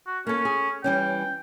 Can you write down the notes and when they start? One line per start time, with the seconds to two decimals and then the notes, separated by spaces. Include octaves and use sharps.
0.07 F#4
0.27 A#3 C#4 A4
0.45 G#4
0.84 E3 G3 C#4 G5